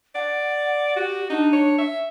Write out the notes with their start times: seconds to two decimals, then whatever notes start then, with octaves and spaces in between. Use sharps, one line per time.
0.15 D5 F#5
0.96 F#4 G4
1.30 D4 D#4
1.53 C#5
1.78 E5